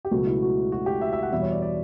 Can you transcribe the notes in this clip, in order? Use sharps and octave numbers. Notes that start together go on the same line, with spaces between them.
G4
C#2 B2 F#3 A3 F#4
E4
F#4
F#4
G4
E5
E5
F#5
E2 B2 G3 E5
C#5
D5
D5